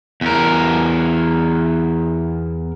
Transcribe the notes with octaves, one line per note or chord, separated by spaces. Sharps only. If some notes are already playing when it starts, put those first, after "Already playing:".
E2 A#4